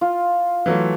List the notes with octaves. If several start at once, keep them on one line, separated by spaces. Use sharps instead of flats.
F4
E3 F#3 A3